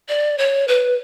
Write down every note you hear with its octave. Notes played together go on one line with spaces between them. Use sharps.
D5
C#5
B4